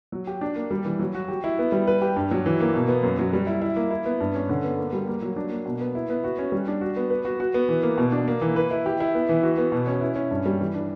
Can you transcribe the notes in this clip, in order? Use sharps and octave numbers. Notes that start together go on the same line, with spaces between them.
F#3
G4
D4
A#3
G3
E3
F#3
F#4
G4
E4
B3
G3
B4
G4
G2
F#3
E3
A#3
B2
B3
F#2
F#3
G3
E4
E4
A#3
E4
B3
G2
C#4
D3
B3
A#3
G3
A#3
F#3
D4
A#3
B2
B3
E4
B3
F#4
C#4
G3
D4
F#4
B3
B4
F#4
F#4
B3
E3
A#3
B2
D4
A#3
E3
B4
E4
G4
E4
B3
E3
F#4
B3
B2
C#4
E4
C#4
G2
G3
E3
D4